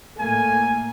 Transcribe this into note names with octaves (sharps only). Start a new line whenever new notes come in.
A2 A3 A#3 G#5